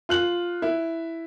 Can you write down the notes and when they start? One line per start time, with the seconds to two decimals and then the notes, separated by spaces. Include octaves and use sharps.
0.09 F4 F#6 F#7
0.62 E4